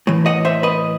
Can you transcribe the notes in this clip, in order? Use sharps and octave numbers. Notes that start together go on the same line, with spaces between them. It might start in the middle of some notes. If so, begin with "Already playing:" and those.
A2 E3
D#5 F#5
C5 E5
B4 D#5